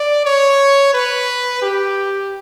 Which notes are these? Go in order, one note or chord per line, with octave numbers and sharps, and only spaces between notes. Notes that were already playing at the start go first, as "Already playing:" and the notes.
Already playing: D5
C#5
B4
G4